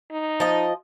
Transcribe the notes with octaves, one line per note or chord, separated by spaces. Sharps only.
D#4
F3 D#5